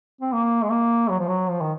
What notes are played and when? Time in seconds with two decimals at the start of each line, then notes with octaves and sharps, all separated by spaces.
0.21 C4
0.33 A#3
0.64 G#3
0.71 A#3
1.10 F#3
1.19 F3
1.28 F#3
1.49 F3
1.61 D#3